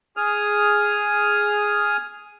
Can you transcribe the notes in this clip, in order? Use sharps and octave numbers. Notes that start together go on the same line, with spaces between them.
G#4 D#6 F6